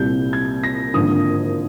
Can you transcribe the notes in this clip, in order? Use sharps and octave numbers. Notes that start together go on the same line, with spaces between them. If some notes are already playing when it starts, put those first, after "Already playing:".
Already playing: C2 A#2 G3 C4 G6
G#6
A#6
G#1 G2 D3 F3 A#3 D#6